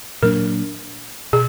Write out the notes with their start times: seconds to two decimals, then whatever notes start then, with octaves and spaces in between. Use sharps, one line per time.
0.22 A#2 F#3 A#3 D4 A#4
1.33 B2 G#4